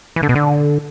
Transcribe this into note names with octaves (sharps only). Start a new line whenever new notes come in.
E3
D3
B2
D3